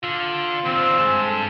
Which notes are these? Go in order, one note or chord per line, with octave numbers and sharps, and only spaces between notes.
D3 F4
D#2 D3 C4
G2 G#3 A5
A4